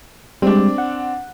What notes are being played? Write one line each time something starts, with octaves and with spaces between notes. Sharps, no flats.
G3 G#3 C4 D4
F#5